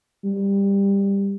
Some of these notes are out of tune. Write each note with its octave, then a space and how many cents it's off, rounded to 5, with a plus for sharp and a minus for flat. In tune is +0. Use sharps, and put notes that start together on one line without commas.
G3 +20